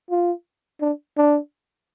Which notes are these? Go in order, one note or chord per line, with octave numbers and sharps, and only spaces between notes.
F4
D4
D4